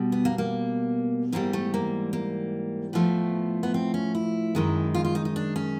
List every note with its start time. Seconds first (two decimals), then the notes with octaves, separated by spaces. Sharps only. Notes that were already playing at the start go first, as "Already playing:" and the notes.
Already playing: B2 G3
0.12 B3
0.25 A#3
0.38 A#3
1.32 G#2 E3 G3 A#3
1.53 A3
1.74 A#3
2.13 A#3
2.93 A2 F3 A3 B3
3.63 B3
3.74 C4
3.94 C#4
4.15 E4
4.55 F#2 D#3 G#3
4.94 F4
5.05 F4
5.15 D#4
5.25 D#4
5.36 D4
5.56 C#4